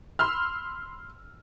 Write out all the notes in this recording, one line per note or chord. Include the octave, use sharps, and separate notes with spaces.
B5 C6 E6 F6